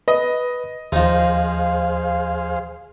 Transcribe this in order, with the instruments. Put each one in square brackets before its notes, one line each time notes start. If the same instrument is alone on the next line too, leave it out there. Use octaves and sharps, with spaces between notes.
[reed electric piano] B4 [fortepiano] D#5
[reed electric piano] D#2 [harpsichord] F3 D#4 [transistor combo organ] G#4 C5 F5